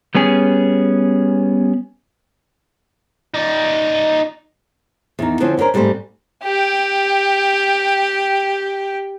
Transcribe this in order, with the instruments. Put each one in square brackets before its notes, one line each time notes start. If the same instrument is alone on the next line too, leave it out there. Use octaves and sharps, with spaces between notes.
[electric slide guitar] G3 B3 C#4 G#4
[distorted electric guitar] D#4 D5
[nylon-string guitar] E2 D#3 D#4
D3 F3 C4 C#4
B3 C#4 D4 A#4 C5
G#2 G3 A3 C4 C5
[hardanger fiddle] G4 G5